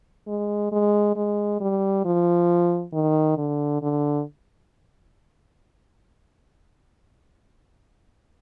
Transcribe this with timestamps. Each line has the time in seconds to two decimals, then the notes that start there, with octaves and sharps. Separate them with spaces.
0.27 G#3
0.72 G#3
1.16 G#3
1.61 G3
2.05 F3
2.93 D#3
3.37 D3
3.82 D3